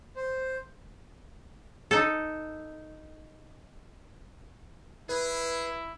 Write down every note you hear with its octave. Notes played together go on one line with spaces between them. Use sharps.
C5
D#4 A4
E4 G#4 B4